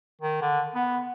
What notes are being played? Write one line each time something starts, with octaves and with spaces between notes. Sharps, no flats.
D#3
D3
B3